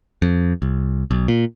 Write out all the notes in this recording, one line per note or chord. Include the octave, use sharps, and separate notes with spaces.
F2
C2
B1
A#2